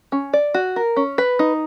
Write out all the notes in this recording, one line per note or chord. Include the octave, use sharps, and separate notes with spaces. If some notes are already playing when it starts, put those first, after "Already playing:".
C#4
D5
F#4
A#4
C#4
B4
D#4